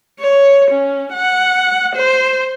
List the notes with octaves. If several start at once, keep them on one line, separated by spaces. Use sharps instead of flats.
C#5
C#4
F#5
C5